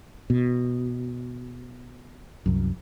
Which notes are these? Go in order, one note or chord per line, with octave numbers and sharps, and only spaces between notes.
B2
C2 F#2